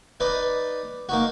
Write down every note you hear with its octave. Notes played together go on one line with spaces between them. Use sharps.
D#4 B4 D5 D#5
A#3 D#4 F#4